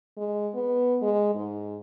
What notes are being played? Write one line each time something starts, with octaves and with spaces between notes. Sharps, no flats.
G#3
B3
G#3
G#2